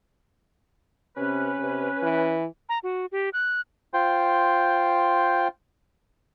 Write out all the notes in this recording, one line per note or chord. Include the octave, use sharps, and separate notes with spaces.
C3 C#4 B4
C3
E3
A#5
F#4
G4
F#6
F4 C5 G5